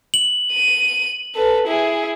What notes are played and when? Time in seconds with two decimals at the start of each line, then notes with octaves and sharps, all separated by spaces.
0.14 F#7
0.52 D#7
1.35 A4 B4
1.67 E4 G#4